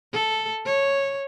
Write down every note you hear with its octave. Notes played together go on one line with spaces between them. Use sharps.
A4
C#5